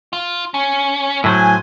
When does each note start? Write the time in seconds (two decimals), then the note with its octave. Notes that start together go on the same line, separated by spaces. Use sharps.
0.13 F4
0.54 C#4
1.24 A2 F#3 C5 G#5